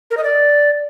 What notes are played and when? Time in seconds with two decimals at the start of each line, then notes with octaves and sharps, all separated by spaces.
0.11 A#4
0.17 D#5
0.24 D5